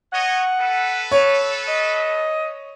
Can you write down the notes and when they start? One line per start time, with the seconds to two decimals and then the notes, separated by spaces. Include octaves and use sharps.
0.13 C#5 D#5 F#5
0.59 A4 B4
1.11 C#5
1.68 D#5